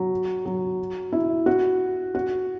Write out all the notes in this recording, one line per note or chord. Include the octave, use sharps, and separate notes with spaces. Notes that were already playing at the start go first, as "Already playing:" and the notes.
Already playing: F#3
F#3
E4
F#4
F#4